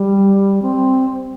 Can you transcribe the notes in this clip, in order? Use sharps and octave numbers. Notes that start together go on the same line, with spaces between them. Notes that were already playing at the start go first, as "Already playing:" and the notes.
Already playing: G3
C4